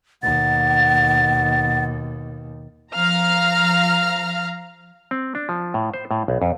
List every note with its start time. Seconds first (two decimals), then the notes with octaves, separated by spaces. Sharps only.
0.23 D#2 B2 F#5 A6
2.92 F3 F5 A#5 F6
5.11 C4
5.35 D4
5.49 F3
5.74 A2
5.94 C5
6.11 A2
6.28 B1
6.42 F2